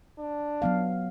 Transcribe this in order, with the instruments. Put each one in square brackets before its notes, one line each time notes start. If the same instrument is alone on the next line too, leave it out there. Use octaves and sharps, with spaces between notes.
[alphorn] D4
[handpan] F#3 B3 F5